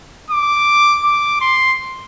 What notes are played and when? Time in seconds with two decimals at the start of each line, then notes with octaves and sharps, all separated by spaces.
0.30 D6
1.04 D6
1.41 C6